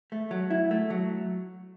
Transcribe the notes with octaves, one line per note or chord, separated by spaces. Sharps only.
A3
F#3
E4
A3
F#3